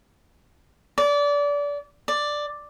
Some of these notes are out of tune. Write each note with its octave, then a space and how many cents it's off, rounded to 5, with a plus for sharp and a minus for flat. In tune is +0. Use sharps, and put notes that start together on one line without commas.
D5 -25
D5 +5